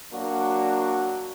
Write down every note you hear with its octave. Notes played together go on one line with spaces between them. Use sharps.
F#3 A#3 D4 F#4